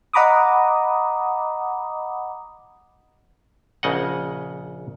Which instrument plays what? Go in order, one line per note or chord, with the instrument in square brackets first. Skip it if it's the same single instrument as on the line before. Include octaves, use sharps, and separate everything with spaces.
[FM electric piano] D#5 F#5 A#5 B5 D6 D#6
[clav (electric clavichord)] A#1 C#3 D#5 F#5